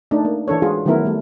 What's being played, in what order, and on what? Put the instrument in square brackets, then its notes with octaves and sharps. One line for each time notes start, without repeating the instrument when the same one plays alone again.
[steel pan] A3 D4 D#4
A#3
E3 D4 A4 C#5
G#3 F4 F#4 G#4
D#3 F#3 A3 B3 E4 A#4
G3 A3